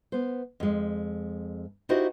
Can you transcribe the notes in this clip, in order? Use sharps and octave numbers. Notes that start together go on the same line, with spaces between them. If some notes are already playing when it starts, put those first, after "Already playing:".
B3 C5
F2 G#3
D#4 E4 F#4 G4 C5 D#5